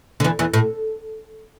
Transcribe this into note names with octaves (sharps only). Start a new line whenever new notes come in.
D3
E2 E3
E2 E3
A2